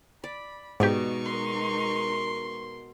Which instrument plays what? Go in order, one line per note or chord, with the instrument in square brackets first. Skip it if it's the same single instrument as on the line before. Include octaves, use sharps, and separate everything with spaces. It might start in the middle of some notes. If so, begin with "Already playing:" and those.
[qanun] D5 [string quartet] B5
[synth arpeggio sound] G#2 G4 [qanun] B2 D5 [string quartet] G#3 D#4 C#6
[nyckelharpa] A#4 C6